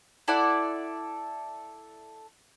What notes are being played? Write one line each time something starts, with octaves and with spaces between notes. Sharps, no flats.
E4 A4 D5 F#5